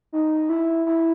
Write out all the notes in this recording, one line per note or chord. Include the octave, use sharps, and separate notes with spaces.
D#4
E4
E4